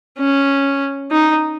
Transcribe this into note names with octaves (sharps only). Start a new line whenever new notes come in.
C#4
D#4